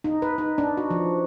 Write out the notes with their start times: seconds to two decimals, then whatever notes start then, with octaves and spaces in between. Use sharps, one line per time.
0.04 D#4
0.22 B4
0.38 D#4
0.58 D4
0.77 F#4
0.90 F3